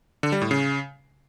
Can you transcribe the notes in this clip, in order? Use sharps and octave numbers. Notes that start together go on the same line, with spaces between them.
D3
G3
A2
C#3